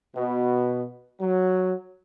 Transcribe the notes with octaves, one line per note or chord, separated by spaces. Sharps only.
B2
F#3